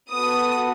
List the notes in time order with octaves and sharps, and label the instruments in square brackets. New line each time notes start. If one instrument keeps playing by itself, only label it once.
[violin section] B3 F#4 A4 D#6